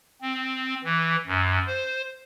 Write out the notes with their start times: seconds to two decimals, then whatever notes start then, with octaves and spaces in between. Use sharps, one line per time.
0.21 C4
0.84 E3
1.27 F#2
1.67 C5